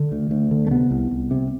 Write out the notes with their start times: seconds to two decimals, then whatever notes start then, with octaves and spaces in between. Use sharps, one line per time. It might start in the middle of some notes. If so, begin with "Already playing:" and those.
Already playing: D3
0.12 D2
0.31 D2
0.51 D3
0.67 A3
0.71 C3 B3
0.91 C2
1.11 C2
1.31 C3